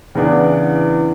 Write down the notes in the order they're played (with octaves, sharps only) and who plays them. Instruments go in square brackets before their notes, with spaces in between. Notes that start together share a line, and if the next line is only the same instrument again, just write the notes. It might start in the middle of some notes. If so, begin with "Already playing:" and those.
[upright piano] E2 C#3 E3 B3 D4